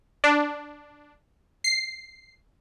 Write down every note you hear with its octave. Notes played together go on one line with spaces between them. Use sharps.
D4
C7